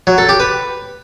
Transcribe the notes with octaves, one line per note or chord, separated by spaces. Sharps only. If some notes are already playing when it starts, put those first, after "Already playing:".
F#3
A4
G4
B4